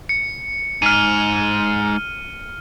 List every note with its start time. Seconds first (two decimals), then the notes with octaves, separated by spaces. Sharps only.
0.09 C#7
0.82 G#2 F6 D#7